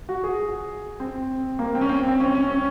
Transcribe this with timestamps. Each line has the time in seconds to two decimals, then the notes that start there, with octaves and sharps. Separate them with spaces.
0.09 F#4
0.24 G#4
1.00 C4
1.59 A#3
1.75 C4
1.81 C#4
1.89 C4
2.08 C4
2.20 C#4
2.35 C#4
2.50 C#4